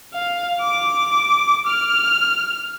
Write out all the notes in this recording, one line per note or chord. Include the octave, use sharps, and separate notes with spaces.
F5
D6
F6